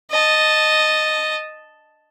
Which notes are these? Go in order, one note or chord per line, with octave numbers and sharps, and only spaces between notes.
D#5 A5